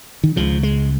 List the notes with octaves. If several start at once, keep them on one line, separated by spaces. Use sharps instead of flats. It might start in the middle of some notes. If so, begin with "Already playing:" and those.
D#3
C#2 C#3 F3
G#3